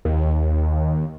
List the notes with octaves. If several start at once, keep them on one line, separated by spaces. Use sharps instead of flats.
D#2